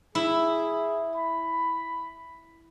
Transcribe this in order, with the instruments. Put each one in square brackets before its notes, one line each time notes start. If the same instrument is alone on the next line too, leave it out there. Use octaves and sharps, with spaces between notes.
[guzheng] E4 [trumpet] G#4
[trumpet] B5